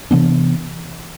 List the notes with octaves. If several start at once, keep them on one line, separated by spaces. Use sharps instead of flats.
C3 E3 B3 D4